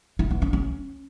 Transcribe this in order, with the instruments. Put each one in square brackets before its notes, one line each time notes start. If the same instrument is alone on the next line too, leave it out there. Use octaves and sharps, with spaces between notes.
[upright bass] E4
B3
C#4
C#4